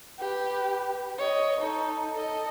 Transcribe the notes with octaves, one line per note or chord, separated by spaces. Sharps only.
G4 B4
C#5 D#5
D#4 A4
A4 D#5